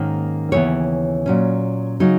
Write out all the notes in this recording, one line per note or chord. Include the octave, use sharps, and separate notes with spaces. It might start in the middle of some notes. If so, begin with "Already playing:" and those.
Already playing: G#2 D#3 A#3 C#4
D#2 C#3 E3 B3 C#5
A#2 F#3 C#4
C#3 F#3 D#4